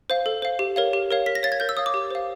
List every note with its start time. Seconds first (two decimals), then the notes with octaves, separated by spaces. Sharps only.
0.10 C5 F5
0.26 A4
0.42 C5 F5
0.59 G4
0.76 A#4 C#5 F5
0.93 G4
1.11 A#4 C#5 F5
1.26 A#4 B6
1.35 A#6
1.43 C#5 F5 A6
1.52 G#6
1.60 A#4 G6
1.69 E6
1.77 C#5 F5 D#6
1.86 D6
1.94 G4
2.11 C5 F5